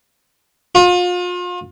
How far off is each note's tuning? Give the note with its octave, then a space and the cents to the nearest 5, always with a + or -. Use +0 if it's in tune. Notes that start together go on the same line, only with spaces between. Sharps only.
F4 +35